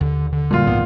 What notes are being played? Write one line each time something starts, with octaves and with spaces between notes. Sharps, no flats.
D#2 D3
D3
F#2 A#2 G3 G#3 F4
C2 G#2 E3 B3